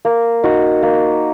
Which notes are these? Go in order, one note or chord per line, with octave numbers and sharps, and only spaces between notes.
A#3
D#4 F#4
A#3